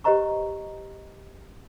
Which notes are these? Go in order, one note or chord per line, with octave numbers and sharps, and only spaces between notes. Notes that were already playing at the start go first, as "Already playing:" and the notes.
G4 B4 C5 D#5 A#5 C#6